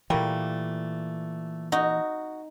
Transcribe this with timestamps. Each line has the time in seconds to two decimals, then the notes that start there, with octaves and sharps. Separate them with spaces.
0.10 A#2 E3 G3 A3 A#3
1.72 D#4 F#4